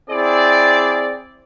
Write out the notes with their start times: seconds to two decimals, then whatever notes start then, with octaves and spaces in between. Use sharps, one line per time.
0.10 C4 E4 G#4 D5